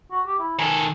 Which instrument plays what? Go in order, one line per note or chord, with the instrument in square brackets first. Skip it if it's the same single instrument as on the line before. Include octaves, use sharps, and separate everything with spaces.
[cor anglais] F#4
G4
E4
[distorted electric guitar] D#3 A4 [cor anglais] G#5